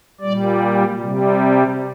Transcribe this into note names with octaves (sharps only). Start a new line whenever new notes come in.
A#2 G3 D5
C3 G3